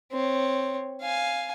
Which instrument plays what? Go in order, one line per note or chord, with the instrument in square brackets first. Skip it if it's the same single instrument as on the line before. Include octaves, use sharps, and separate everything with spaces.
[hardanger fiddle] C4 C#5
F5 G#5